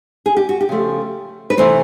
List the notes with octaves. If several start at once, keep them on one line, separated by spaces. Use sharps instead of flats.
G#4
G4
F#4
G4
C#3 F3 A3
B4
C3 E3 A3 C5